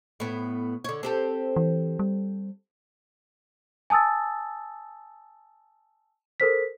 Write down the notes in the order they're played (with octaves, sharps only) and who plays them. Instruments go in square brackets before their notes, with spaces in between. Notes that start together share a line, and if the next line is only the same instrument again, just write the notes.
[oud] A2 B3
D3 C#5
C4 G4 A4
[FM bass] E3
G3
[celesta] G#5 A5 D#6 E6 A6
A4 A#4 C5 B6